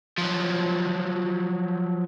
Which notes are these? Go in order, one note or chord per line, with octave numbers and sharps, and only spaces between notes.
F3 F#3